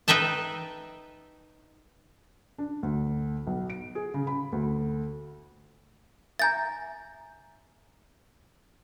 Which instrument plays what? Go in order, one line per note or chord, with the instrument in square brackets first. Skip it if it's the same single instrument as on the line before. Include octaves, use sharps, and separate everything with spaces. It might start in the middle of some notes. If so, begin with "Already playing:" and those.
[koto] D#4 B4 E5 G5 A5
[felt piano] D4
D2
B1
D7
G#4
C#3
B5
D2
[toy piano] E5 G#5 A#5 [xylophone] G6 A6